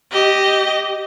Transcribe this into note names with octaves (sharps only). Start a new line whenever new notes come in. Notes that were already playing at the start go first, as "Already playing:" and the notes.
G4 D#5